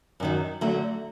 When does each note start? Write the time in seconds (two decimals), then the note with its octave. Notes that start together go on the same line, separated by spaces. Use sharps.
0.20 F#2 D#3 F#3
0.61 D3 F#3 A3